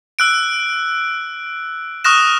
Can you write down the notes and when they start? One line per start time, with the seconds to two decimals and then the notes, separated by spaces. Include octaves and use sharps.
0.19 E6 F#6 D7
2.04 C#6 D#6 F6 F#6 A#6 E7